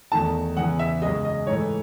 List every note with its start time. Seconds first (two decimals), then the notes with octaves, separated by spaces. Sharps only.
0.12 E2 D#3 A3 A5
0.57 E2 C#3 E3 F#5
0.79 E5
1.02 F#2 C#3 G#3 D#5
1.25 D#5
1.47 G#2 E3 A3 C#5